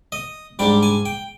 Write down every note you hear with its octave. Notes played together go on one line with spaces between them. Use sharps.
D#5
G#2 G3 D4 G5
G#5
G5